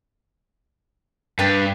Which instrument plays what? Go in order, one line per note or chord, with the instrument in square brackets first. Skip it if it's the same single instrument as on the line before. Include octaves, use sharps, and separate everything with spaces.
[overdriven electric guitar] G2 [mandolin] D4 G4 B4